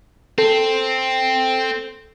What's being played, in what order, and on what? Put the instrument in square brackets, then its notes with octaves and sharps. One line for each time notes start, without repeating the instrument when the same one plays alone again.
[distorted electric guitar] C4 [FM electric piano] A4